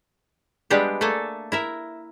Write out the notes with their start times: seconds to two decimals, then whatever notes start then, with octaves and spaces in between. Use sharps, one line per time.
0.70 G3 G#3 B3 D4 G4
1.01 A3 A#3 A4 G#5
1.52 E4 A#4 E5